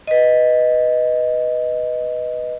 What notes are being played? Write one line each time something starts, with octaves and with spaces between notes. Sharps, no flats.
B4 D#5